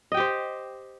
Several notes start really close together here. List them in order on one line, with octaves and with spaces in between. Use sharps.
D#5 G5 G4 C5